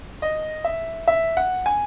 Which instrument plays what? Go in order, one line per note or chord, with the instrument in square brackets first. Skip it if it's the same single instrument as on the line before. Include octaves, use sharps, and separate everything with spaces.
[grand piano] D#5
E5
E5
F#5
G#5